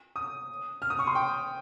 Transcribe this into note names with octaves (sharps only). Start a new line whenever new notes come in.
D#6
F6
D#6
C#6
C6
G5